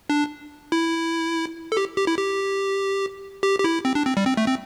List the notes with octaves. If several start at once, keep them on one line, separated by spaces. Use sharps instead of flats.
D4
E4
A4
G4
G4
E4
G4
G4
G4
E4
C4
D4
C4
G3
C4
A3
C4